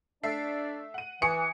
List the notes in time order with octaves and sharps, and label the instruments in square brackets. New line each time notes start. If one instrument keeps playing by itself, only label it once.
[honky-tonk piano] A3 E5 C7 [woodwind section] D4 D5
[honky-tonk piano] F#5 D#7
[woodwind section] E3 [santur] G#5 C#6 [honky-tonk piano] D#6 [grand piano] C#7